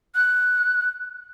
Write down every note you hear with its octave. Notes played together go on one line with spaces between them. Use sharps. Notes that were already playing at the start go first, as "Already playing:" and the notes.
F#6